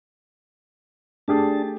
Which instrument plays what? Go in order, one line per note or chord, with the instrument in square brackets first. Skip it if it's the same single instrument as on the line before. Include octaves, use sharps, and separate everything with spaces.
[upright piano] A3 G4 G#4 [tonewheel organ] D4 A5